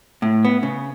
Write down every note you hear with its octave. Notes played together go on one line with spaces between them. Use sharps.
A2
B3
C#3